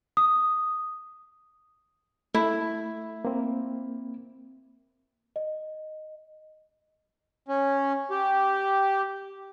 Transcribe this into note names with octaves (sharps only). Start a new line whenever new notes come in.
D#6
A3 E4
A#3 C4
D#5
C#4
G4